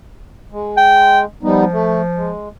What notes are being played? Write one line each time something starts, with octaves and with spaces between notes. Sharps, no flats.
G#3
G5
F3 G3 B3 D#4
A3
G#3